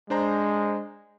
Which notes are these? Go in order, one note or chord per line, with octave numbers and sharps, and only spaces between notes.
G#3 D4 C5 A#5